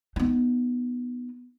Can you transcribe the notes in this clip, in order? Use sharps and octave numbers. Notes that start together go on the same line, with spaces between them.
B3 D#4